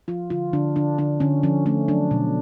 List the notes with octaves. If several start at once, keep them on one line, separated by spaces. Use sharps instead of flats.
F3 F4
D3 F4
D3 D4
D3 D4
D3 D4
D3 C#4
F3 C#4
A3 C#4
F#3 D4
B2